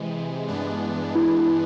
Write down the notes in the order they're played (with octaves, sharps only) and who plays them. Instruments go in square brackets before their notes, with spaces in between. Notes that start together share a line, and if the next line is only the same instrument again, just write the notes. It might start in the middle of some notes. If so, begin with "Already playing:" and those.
Already playing: [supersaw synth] C3 E3 G#3
G2 E3 G#3 B3 D4
[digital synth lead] E4